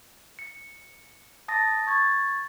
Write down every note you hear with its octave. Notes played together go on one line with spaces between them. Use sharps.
C#7
A5 D#6 A6 A#6
C#6 G#6 A6